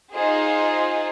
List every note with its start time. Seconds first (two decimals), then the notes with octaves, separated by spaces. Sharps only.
0.13 D#4 F4 G#4 C5